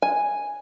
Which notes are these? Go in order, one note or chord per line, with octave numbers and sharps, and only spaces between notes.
G#5